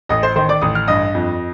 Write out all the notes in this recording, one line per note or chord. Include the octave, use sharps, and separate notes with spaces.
A1 D#5 D#6
C5 C6
D#3 C5 C6
D5 D6
A1 D#6
F6
G2 D#5 D#6
F2